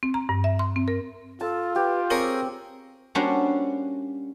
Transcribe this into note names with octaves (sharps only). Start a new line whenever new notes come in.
C4
A#5
G2
E5
C6
C4
A#4
F4 A4 A5
G4 B4
C4 G#4 A#4 C#5
G3 A#3 C#4 D4 F#4 C5